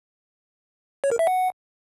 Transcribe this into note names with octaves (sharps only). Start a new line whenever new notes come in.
C#5
A#4
E5
F#5